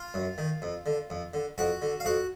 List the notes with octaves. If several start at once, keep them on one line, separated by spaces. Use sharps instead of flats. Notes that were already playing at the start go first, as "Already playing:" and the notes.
Already playing: F4 F5
F#2
D#3
F2
D3
F2
D3
F2 F#4 F#5
D3
F5
F2 F#4 F#5